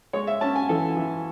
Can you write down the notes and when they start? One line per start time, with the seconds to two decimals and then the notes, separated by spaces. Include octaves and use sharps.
0.13 G#3 C#5
0.27 E5
0.41 C#4 A5
0.56 G#5
0.69 E3 A4
0.97 E3